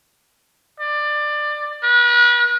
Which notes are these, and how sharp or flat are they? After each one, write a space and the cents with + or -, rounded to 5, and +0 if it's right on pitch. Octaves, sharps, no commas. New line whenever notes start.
D5 +20
B4 -40